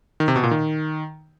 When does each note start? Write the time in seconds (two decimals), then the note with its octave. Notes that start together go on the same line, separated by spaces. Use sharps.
0.20 D#3
0.28 C3
0.36 B2
0.44 A#2
0.51 D#3